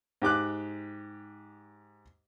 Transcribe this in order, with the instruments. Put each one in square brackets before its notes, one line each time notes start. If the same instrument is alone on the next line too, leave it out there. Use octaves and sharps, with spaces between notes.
[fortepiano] G#2 G4 D6 F#6